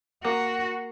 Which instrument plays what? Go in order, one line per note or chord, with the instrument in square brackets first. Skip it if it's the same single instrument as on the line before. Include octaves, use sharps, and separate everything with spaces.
[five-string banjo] A#3 [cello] F#4